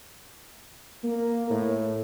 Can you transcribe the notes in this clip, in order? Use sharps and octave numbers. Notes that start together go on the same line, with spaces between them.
A#3
A2